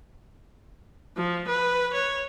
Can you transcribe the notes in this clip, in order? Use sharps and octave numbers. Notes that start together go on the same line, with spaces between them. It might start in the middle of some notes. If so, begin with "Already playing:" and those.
F3
B4
C#5